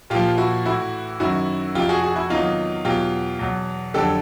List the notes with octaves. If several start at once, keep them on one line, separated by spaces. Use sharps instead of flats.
A#2 F3 F4 G4
E4 F#4
A2 E3 E4 F#4
F#2 D#3 F#3 E4 F#4
F2 C3 F3 F4 G4
F#4 G#4
F#4 G#4
E4 F#4
E2 C3 D#3 F#3 D#4 F4
E2 B2 F#3 F4 G4
E2 B2 F#3
F2 D3 F#3 G4 A4